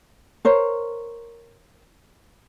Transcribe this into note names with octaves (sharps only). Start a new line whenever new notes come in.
A#4 C5 C#5